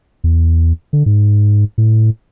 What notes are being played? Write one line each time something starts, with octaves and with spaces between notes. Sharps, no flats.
E2
D3
G#2
A2